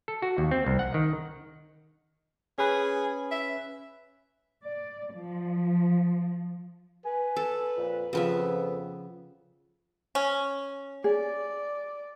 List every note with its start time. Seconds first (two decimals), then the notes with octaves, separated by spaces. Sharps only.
0.08 A4
0.22 F#4
0.38 D#2
0.51 C4
0.66 C2
0.79 F#5
0.94 D#3
2.58 C#4 G#4 B4
3.31 E5
4.65 D5
5.16 F3
7.05 B4 G#5
7.36 A4
7.77 F2 A#2
8.13 F2 C#3 F3 B3 E5
10.15 C#4
11.04 G#4 D5